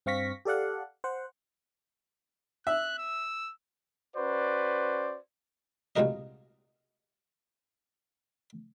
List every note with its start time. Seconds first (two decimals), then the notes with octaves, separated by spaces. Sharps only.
0.06 G2 C4 F5 C#6 A#6 B6
0.45 G4 A4 D5 F5 F#5
1.04 C5 F#5
2.67 E5 F#6
2.98 E6
4.16 C#4 F#4 B4 C5 D5
5.96 C2 A#2 G#3 F#4 A#4 D#5